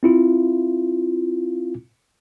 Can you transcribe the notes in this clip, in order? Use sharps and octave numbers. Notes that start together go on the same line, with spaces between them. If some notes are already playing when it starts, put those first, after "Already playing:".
C4 E4 F4